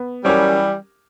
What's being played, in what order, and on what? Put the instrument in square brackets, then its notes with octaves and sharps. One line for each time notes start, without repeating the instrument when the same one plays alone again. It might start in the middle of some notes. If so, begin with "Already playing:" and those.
Already playing: [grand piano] B3
[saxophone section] E3 G3 [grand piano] F#3 C#4 G4 A#4